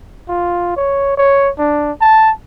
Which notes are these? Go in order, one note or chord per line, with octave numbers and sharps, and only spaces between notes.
F4
C#5
C#5
D4
A5